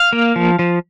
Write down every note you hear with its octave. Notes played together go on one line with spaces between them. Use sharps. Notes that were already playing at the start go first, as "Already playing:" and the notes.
Already playing: F5
A#3
F3
F3